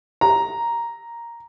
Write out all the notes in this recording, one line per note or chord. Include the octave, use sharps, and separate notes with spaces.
A#5